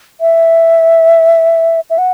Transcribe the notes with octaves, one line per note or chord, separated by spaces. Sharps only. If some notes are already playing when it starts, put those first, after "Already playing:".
E5
E5
F#5